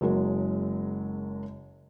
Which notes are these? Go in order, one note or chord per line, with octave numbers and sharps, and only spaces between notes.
F#1 F#3 G#3 A#4